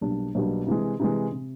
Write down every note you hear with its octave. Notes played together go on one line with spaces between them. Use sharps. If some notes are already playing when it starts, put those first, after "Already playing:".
B1 B2 G3 A#3 D4
B1 B2 G3 A#3 D4
C3 E3 G#3
C3 E3 G#3
C3